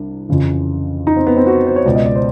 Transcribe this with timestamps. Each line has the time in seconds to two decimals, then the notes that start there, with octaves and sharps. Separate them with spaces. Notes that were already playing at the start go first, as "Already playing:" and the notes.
Already playing: C2 C3 D4
0.29 F2 C#3 E3
1.07 D#4
1.17 C4
1.27 B3
1.37 C4
1.46 F#4
1.67 C5
1.76 C#5
1.86 C#2 B2 D5
1.95 D#5
2.06 D5
2.15 C5